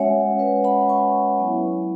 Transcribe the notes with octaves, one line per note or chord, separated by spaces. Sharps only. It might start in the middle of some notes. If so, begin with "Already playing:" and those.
Already playing: G#3 C#4 F#4 C#5 E5 F#5 G#5
B4 E5
F#5 B5
G#5 C#6
F#3 B3 E4